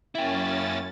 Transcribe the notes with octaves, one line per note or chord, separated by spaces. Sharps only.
F#2 A#3 C#4 E4 E5 G5 A6